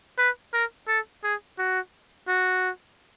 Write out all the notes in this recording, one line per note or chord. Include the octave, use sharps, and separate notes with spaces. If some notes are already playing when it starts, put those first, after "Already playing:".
B4
A#4
A4
G#4
F#4
F#4